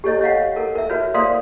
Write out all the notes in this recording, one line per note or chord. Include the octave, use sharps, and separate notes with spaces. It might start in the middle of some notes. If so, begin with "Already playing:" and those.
G4 A4 C#5 D#5
C#5 D#5 F5 F#5
A4 A#4
A#4 E5
F#4 B4 C#5
A#4 C5 D5 F5 C6 D#6